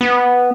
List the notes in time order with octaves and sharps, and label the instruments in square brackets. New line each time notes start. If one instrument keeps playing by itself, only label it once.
[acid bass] B3